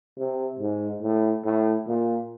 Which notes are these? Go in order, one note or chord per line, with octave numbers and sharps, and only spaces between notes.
C3
G#2
A2
A2
A#2